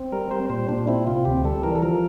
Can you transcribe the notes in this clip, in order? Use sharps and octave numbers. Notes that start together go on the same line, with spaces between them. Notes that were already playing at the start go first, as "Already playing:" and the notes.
Already playing: C4
G3 A#4
G3 C5
A#2 C5
A#2 D4
C4 E4
C3 F4
D2 G4
G3 A4
E3 A#4
A4
F3 A#4